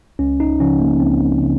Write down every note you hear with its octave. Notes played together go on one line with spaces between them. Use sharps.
C#2 C#4
D#4
C#3 F3 C#4
A#3
C#2 C4
C#3